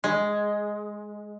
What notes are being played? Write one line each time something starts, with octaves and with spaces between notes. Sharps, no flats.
G#3